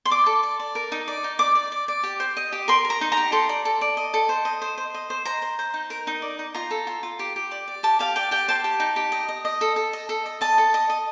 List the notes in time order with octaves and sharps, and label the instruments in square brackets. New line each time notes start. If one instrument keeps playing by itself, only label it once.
[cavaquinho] C6
D5 D6
A4
D5
D5
A#4
D#4
D5
D#4
D5 D6
D5
D5
D5
G4
C5
D#5
G4
A#4 C6
A#4
A#5
D#4
A#5
G4
A4 C6
D5
A4
D5
D#5
A4
C5
D#5
C5
C5
D#5
C5
C5 A#5
C5
C5
D#4
A#4
D#4
D5
D#4
F4 A#5
A4
F4
F4
G4
G4
D5
D5
G4 A5
G4 F5
D5 G5
G4 G5
C5 A5
G4
D#4
G4
D#5
D#5
D#5
A4
A4
D#5
A4
D#5
D#5 A5
A4
D#5
D#5